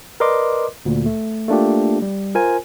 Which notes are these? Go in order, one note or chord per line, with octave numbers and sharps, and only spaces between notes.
A#4 B4 D5 D#5 C6 D6
D2 A#2
A3
A3 A#3 D4 F4 G4
G3
F4 A#4 C5 G#5